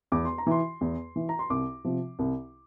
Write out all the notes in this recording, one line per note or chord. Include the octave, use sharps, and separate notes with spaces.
E2 D6
C6
A#5
E3 C6
E2
E3
A#5
C6
C2 D6
C3 F3
C2